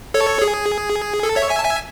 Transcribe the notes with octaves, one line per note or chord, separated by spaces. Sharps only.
A4 C#5
G#4
A4
C#5 E5
E5 G#5
A5
E5 G#5